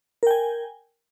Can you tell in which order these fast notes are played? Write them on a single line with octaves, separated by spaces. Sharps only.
A#4 G5 G#5